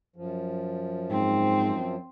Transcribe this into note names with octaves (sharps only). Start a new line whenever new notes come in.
F#2 F3
G#2 C4